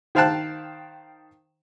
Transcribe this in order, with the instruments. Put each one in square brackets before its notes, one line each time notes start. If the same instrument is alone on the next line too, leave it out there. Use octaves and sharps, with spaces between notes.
[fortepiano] D#3 C5 F5 G5 A5 F#6